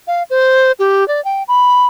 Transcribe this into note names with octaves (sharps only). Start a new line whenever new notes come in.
F5
C5
G4
D5
G5
B5